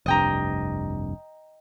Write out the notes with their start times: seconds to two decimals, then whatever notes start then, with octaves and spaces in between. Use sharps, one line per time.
0.06 F1 C2 G2 D#5 G5 A#5